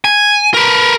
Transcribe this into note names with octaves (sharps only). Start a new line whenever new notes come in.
G#5
A#4 B4